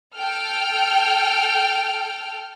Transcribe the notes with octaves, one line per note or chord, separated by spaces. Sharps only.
A4 G5 F6